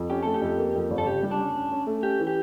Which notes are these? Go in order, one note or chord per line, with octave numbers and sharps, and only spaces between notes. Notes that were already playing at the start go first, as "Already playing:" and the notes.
Already playing: F2
C#4 G4
A3 A4
G4
F2
A#3
F2
G1
A4
C#3 G4
G3
D4
C#4
C#4
C#4
A3
C#4 G4
E3
G4